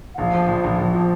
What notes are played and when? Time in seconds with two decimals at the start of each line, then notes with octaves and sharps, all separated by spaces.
0.14 F#5
0.18 A#1 F5
0.33 F3
0.48 A#1
0.64 A#1
0.78 A#1
0.94 F3